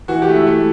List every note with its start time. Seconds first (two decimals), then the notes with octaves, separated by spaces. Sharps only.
0.08 E3 F#4
0.22 G4
0.28 A3
0.35 E4
0.47 A3